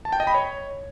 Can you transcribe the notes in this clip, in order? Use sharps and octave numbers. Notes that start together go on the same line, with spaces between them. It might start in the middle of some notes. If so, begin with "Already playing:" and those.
A5
G5
D#5
B5
C#5